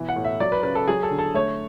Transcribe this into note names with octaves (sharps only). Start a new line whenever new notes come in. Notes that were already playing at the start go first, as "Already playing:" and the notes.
Already playing: B2 E3
F#5
A2
E5
F#3 D5
B4
C#3 B4
A4
F#3 G#4
A4
D3
A4
A3 C#5